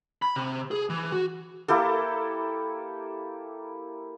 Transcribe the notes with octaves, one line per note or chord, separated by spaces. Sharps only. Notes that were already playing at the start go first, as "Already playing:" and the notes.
B5
C3
G#4
E3
F#4
A#3 E4 G4 A4